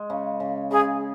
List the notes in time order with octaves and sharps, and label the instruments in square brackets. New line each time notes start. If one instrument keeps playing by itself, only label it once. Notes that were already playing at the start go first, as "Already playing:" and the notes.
Already playing: [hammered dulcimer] G#3
C#3
C#3
[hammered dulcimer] C#3 [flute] G#4